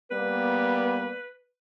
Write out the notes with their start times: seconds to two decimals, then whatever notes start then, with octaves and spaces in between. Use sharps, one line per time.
0.11 G3 A#3 B3 B4